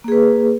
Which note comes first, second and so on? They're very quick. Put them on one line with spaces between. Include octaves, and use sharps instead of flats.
A#3 G#4 B4